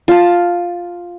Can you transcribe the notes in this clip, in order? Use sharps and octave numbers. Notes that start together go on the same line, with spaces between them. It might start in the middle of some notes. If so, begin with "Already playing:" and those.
F4 A5